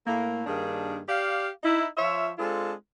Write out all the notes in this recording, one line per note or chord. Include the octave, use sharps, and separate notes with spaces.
A2 A3 A#3
G2 D#3 A#3 D4 G#4
G4 D5 F5
D#4 E4
F3 F4 C#5 E5
G#3 C4 D4 F4 A4